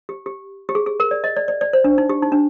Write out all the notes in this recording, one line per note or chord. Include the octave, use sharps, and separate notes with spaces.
G4
G4
G4
G#4
G#4
A#4
D5
D#5
D5
D5
D5
C5
D4
D#4
G4
D#4
D4